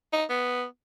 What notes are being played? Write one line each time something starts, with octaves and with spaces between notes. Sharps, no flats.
D#4
B3